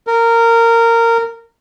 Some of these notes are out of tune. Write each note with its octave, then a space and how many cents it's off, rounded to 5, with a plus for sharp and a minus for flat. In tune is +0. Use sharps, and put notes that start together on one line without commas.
A#4 -15